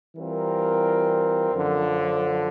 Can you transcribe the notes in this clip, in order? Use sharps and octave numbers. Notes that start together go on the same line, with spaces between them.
E3 G3 C4 F4 A#4
F#2 D3 F3